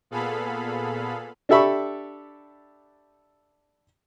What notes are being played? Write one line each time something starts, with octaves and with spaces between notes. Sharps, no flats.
A#2 B3 G#4 A4 F5 B5
D4 G4 A4 E5 B5 C#6